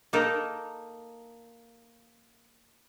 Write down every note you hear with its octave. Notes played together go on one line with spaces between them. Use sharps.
A#3 D#4 A4 A#4